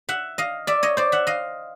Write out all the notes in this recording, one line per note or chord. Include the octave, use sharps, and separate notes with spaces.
E5 F#5
D#5 F5
D5 E5
C#5 D#5
C5 D5
E5 F#5
D#5 F5